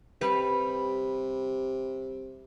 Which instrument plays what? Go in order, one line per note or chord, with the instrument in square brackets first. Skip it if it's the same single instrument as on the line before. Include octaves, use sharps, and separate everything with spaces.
[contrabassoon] C3 [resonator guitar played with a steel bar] G3 B4